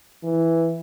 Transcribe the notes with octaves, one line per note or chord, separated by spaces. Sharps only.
E3